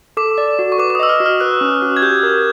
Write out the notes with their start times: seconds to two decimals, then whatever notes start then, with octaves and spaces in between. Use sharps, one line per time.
0.17 A4 D6
0.38 D5
0.59 F#4
0.72 C#6
0.78 B4 D6
0.90 D6
0.95 D#6
1.00 D#5 E6
1.09 F6
1.20 F#4
1.26 F6
1.40 B4 F#6
1.61 C#4
1.82 F#4
1.97 G#6
2.02 G4 G6
2.23 A#4